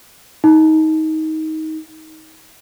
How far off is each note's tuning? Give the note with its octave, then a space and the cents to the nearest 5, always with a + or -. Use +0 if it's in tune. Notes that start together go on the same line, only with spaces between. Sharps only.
D#4 +20